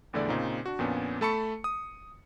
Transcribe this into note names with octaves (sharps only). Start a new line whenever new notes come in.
A#1 E2 D3 A3 E4 D5
A#2 C#3 C4 D#4
D4 F#4
F2 A#2 B3 C#4 D4
A3 A4 A5 B5 C#6 C#7
D#6